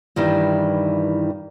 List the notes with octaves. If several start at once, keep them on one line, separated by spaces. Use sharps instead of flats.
G2 D#3 E3 G3 E4